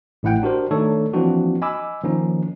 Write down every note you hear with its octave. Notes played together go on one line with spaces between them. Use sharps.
A1 A2 E4 F#5 G5
D4 F#4 G4 A#4 C5
D#3 A3 D4 D#4 A4 C#5
E3 F3 A#3 C4 D4 F#4
D#5 G#5 B5 D6 E6
D#3 F3 A#3 C#4 D#4